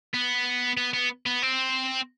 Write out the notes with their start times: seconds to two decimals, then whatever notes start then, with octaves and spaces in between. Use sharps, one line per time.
0.14 B3
0.77 B3
0.94 B3
1.26 B3
1.42 C4